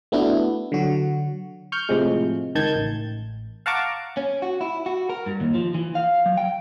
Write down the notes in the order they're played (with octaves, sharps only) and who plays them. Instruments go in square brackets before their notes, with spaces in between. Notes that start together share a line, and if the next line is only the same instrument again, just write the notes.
[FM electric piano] A3 B3 D4 E4 F#4
D3 F#3 F#4
C#6 F6 G6
A2 C3 F3 G#3
C#2 D#3 A5 G6 G#6
A1
F5 F#5 A5 A#5 C#6 D6
[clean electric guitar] C#4
F#4
E4
F#4
A#4
G2
D#2
F3
E3
F5
F#3
G5